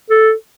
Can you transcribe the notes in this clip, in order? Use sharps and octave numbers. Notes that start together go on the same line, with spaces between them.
A4